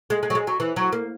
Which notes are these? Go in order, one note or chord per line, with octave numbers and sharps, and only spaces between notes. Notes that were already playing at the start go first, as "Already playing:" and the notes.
G#3
G#3
F#3
G#3
F#3
E3
F#3
A#3